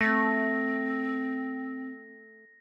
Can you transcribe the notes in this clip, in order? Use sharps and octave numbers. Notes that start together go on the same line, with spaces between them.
A3 C4 A#6